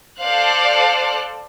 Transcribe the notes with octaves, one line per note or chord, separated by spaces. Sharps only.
A4 C5 D5 F5 A5 F#6